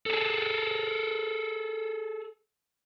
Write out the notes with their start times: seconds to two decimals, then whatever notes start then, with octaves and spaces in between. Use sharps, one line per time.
0.06 G#4 A4